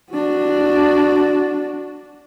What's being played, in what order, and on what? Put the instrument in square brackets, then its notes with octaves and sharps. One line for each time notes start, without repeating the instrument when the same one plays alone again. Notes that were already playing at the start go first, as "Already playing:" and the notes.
[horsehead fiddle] D4 F#4